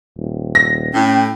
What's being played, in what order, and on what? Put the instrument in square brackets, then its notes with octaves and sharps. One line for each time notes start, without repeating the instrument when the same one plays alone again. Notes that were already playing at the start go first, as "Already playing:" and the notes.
[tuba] D#1
[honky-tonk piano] A#6
[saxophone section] A2 [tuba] C#4 [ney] G5